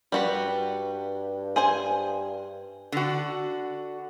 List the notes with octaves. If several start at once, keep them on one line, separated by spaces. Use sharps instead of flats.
G2 G3 F#4 B4
G#4 C5 G#5
D3 F#4